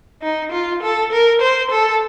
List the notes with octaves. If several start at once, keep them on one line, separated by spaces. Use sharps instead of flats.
D#4
F4
A4
A#4
C5
A4